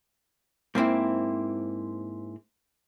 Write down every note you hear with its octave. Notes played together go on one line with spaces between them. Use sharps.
G#2 A#3 C4 E4